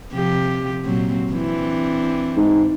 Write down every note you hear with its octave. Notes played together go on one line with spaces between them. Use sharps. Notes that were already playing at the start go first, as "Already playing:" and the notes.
C3 F3 G4
A#2 F#3 C4
E3 C4 D4
G#2